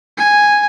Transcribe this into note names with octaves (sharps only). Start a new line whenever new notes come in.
G#5